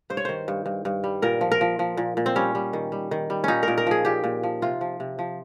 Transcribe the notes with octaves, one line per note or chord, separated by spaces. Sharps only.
G2 C5
C#5
D#3 C5
G2
G2
G2
G3
A#2 A#4
F3
A#4
F3
F3
A#2
A#2
C4
G3 C#4
G3
D#3
G3
D#3
G3
A#2 C#4 D#4
A#4
A#2
A#4
F3 G#4
A#2 G4
A#2
F3
C3 F4
F3
C3
F3